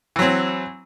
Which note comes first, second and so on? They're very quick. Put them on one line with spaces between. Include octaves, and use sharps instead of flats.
E3 F#3 C4